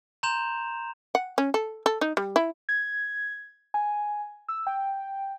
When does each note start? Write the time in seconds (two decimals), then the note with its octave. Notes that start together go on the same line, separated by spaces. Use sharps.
0.23 A#5 C6 G6 E7 F7
1.15 F#5
1.38 C#4
1.54 A4
1.86 A4
2.01 D#4
2.17 G3
2.36 E4
2.69 G#6
3.74 G#5
4.48 E6
4.67 G5